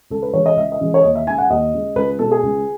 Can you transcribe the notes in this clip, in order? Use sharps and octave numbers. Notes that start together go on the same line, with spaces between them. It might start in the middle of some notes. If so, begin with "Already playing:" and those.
C#2 A4
B4
C#3 E3 G#3 C#5
D#5
C#2 E5
D#5
C#3 E3 G#3
C#5
D#2 D#5
E5
C#3 G#3 G#5
F#5
D#2 D#5
C#3 G#3
C#2 B4
B2 G#3 A4
G#4
C#2